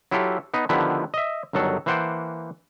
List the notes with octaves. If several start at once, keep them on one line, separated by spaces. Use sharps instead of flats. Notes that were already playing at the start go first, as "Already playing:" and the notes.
F#3 E4 F4 G4 A4
B3 D#4
D3 D#3 F3 B3 E4 G4
D#5 E5
G1 D#3 F#3 A4
E3 A#3 C5 F#5 G5 A5